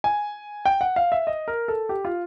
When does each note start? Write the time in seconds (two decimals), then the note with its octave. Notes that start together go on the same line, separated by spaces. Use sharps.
0.04 G#5
0.65 G5
0.81 F#5
0.96 F5
1.12 E5
1.27 D#5
1.48 A#4
1.68 A4
1.89 G4
2.05 F4